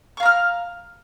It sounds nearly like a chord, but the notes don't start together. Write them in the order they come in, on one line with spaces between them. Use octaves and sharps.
C#6 F5 A#5 F6